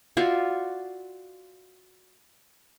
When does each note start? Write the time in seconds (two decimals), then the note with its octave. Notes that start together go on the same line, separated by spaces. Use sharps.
0.17 F4 F#4 D5 E5